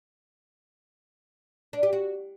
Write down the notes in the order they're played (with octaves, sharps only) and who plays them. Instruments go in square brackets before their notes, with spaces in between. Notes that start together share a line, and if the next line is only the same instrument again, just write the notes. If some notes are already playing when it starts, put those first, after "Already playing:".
[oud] D4
G4
F#4